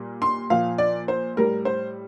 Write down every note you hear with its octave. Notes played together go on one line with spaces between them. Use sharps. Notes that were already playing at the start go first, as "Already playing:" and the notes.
Already playing: A#2 G3
C6
A#2 F3 F5
D5
C5
A2 G3 A#4
C5